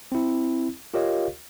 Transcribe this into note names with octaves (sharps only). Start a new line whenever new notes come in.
C4 E4
F4 G4 A#4 C#5 D#5 F5